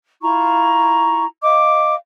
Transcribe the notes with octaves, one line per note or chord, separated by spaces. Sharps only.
E4 F4 A#5 C#6
D#5 F5 D6